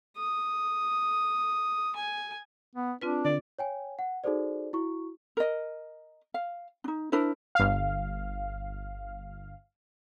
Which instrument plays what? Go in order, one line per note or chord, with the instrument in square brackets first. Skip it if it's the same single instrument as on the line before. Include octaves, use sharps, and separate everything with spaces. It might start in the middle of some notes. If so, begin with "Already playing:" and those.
[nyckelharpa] D#6
G#5
[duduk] B3
[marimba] C4 F4 B4 [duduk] D4
[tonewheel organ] D3 [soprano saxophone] D5
[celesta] C#5 G5 G#5
F#5
D#4 F#4 G#4 A4 C5 D5
E4 F#4 C#6
[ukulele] A#4 D#5
F5
D4 D#4
D4 E4 A#4 C5
[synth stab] G1 F5